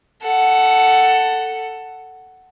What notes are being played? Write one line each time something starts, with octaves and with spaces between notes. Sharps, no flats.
A4 F#5